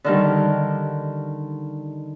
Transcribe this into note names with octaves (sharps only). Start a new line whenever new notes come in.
D3 D#3 G3